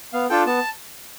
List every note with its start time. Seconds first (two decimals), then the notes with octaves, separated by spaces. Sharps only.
0.13 B3 F5
0.30 D4 F4 A4 G5
0.46 B3 A5